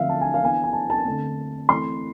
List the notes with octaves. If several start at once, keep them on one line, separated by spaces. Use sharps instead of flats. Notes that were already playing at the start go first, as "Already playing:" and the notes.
Already playing: D3 F3 A3 C4 E5 F5
A5
G#5
F5
E3 B3 D4 G#5
G#5
A5
A5
D3 A3 C4
E3 A3 C4 C6